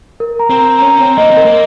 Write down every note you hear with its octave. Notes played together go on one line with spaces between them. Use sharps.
A#4
A#5
C4
A#5
C#4 A#5
C4 A#5
A#3 D#5
C4
A#4
A#3